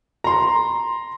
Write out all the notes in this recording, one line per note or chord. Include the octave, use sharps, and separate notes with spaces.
A#5 C6